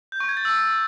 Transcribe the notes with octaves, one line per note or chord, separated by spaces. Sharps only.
G6
C#6
G#6
A6
E6